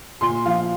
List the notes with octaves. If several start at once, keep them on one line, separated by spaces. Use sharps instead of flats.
A#2 C6
F3 F5